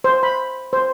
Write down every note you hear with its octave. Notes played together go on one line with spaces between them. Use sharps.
C5
B5
C5